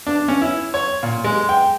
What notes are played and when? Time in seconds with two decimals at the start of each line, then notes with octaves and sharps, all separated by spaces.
0.07 D4
0.28 C#4
0.42 E4
0.74 C#5
1.03 A#2
1.24 G#3
1.49 G5